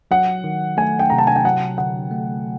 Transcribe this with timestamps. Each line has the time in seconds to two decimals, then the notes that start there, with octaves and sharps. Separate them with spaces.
0.11 F#3 F#5
0.44 D#3
0.77 A3 G#5
0.99 G5
1.10 C3 A#5
1.18 A5
1.27 G#5
1.36 G5
1.44 F#3 F#5
1.78 D3 F#5
2.11 A3